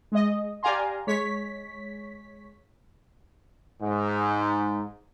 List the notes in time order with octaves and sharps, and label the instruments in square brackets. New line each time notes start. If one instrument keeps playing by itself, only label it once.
[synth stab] G#3 D#5
G4 D5 F5 G#5 A#5 C6
G#3 C#5 B6
[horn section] G#2